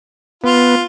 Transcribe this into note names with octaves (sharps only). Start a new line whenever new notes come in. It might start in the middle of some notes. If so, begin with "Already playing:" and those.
B3 F4